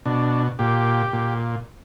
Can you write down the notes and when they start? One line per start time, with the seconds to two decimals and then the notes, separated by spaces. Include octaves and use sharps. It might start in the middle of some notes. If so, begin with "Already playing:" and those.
0.06 B2 D4
0.59 A#2 G4
1.13 A#2